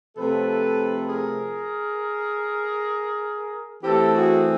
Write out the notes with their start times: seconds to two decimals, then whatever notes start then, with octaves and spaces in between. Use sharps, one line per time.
0.17 C3 F3 A3 A4 B4
1.09 G#4 A#4
3.84 E3 A3 C4 G4 A4
4.14 F#4 G#4